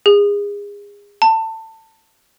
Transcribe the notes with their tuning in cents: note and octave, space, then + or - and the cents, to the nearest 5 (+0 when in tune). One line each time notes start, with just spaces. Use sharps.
G#4 -30
A5 +20